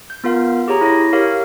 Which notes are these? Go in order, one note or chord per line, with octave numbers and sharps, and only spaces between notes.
G6
B3 F4 A#4 F5
G4 G#4 C#5 A#5
E4 C#5 A#6
G4 A#4 C#5 F5